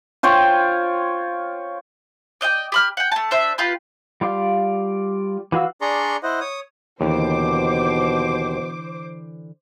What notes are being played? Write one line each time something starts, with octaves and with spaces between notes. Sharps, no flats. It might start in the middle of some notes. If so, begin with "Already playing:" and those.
F4 C5 C#5 G5
D5 D#5 F#5 G5
G4 B5 F6
F#5 G5
A3 A5
D4 C5 E5
F4 G4 B4
G3 F4 D5 F5
E3 F#4 F5 E6
D4 G#4 D5 A#5 C6 C#6
E4 C5 D#5 F#5
C#5 D#6
D#2 B2 D3 E3 C5 D6